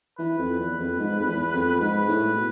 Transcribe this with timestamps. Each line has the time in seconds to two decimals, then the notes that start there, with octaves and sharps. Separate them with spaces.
0.19 E3 B4
0.39 F2
0.59 E2
0.80 F2
0.99 G#2
1.19 F2
1.27 E2
1.53 F2
1.81 G#2 B4
2.08 A2
2.34 B2